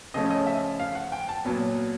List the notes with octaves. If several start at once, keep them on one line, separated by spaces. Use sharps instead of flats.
C#3 F3 A3 C#4 D#5
D#5
E5
F5
F#5
G5
A5
A#2 F#3 B3